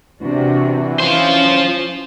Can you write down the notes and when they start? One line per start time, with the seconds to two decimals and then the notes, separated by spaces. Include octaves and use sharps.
0.21 C3 E3 D4 F#4
1.00 C#4 F4 C5